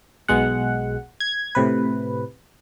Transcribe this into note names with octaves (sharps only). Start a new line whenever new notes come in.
B1 B2 G#3 F#5
G#6
A2 C3 B4